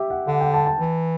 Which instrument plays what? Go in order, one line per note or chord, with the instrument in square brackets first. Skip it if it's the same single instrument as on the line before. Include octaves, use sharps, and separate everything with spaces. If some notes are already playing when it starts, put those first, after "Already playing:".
Already playing: [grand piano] G4 E5
F#5
[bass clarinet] D3 [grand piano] F#5
[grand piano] G5
A5
A5
[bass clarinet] E3